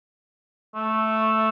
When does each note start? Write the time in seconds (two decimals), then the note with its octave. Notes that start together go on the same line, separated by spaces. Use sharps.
0.75 A3